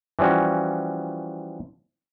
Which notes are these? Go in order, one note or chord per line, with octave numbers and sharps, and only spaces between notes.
E3 F3 G3 C#4 F#4